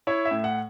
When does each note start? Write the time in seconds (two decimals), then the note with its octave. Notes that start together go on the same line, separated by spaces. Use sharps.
0.07 E4 C#5
0.25 E5
0.31 A2
0.44 F#5